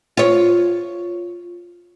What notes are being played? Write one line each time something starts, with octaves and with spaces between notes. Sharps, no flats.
F4 C#5